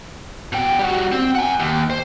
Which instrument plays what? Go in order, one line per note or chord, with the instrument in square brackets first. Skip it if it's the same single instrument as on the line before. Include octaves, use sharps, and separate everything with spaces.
[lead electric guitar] B2 G5
G3 F#4
C4
F#5 G#5
D#2
C5